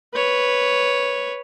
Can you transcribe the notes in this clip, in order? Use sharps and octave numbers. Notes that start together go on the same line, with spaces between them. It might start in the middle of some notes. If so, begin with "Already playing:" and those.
B4 C#5